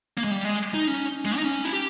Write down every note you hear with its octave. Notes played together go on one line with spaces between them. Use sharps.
A#3
G#3
G3
G#3
D#4
C#4
G#3
D#4
C#4
E4
G4